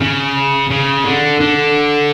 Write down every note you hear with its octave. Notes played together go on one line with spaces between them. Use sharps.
C#3
C#3
D3
D3